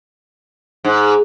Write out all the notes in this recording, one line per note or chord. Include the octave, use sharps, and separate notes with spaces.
G#2